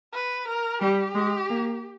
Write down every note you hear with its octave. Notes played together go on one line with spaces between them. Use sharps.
B4
A#4
G3 G4
G#3
A#3